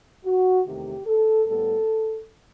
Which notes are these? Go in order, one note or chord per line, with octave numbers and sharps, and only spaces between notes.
F#4
E2 C3 D#3 A3 G4
A4
A2 G3 B3 A4